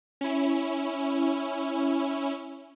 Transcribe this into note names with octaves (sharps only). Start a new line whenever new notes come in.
C#4 E4